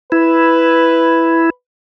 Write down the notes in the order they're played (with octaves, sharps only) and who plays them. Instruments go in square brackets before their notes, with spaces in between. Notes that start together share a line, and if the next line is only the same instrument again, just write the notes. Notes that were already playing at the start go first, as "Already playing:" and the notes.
[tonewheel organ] E4 [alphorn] B4